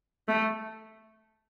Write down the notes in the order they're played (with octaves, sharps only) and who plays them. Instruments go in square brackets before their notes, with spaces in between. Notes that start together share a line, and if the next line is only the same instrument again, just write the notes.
[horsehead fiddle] A3